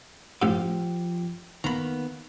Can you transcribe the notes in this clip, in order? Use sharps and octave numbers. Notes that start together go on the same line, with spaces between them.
A1 A2 F3 G4
D#3 A#3 B3 A#5 B5